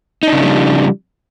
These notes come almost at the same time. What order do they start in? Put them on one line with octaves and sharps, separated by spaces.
D#4 D4 C#3 F3 G3